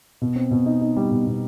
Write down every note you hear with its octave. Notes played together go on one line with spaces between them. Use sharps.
B2
C4
B2
D#4
D#4
G3
B2
B2